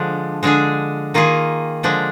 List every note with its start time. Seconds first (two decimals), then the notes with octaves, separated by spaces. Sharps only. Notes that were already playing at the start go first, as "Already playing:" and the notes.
Already playing: D3 F3 G#3 D4
0.43 D3 G#3 D4 G#4
1.14 D#3 A#3 F4 G#4
1.83 D3 F3 G#3 D4